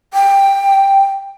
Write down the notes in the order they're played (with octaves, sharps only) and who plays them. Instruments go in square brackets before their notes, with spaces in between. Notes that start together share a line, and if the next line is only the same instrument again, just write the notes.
[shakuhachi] G5